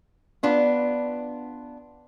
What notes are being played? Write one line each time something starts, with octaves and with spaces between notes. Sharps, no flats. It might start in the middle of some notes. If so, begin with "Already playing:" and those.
B3 D4 F4